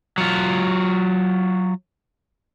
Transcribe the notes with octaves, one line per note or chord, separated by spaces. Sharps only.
F#3 F4